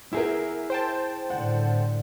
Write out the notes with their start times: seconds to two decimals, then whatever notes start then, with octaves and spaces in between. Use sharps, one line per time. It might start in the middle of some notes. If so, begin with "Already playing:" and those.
0.13 E4 G#4 A#4 E5
0.70 C5 G5 A5
1.30 A2 D3 G3 F#5